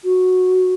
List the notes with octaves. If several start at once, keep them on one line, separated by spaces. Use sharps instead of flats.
F#4